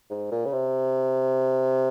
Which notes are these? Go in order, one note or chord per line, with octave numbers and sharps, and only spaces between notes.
G#2
A#2
C#3
C3